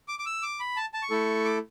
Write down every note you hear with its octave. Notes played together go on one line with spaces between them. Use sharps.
D6
D6
E6
D6
B5
A5
A5
C#6
A3 E4 A4
D6